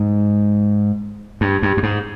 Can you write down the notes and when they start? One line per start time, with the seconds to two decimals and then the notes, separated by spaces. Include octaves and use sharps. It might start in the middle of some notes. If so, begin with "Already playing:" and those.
Already playing: G#2
1.41 G2
1.62 G2
1.77 G2
1.83 G#2